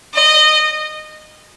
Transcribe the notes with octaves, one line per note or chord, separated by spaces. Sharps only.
D#5